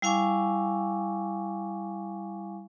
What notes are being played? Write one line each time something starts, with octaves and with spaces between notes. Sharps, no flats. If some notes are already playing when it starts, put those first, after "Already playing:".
G3 E4 F5 G#5 C#6 D6